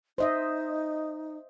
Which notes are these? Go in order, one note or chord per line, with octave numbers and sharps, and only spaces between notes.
D#4 C5 D#5 E5